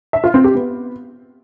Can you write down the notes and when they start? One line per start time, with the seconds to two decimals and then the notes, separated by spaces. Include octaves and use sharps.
0.13 E5
0.24 F4
0.34 C4
0.44 G4
0.55 B3